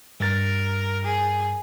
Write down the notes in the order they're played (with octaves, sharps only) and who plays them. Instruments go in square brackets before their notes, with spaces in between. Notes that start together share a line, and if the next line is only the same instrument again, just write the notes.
[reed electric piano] G2 A6 [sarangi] A#4
[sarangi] G#4